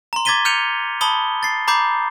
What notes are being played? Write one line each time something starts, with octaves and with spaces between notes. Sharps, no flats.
A#5 C6
D6 G#6 A6 B6 D#7 G7
F6 G6 C#7 D#7 F7 G7
A5 B5 D#6 G7
A6 C7
A#5 B5 D6 G6 C7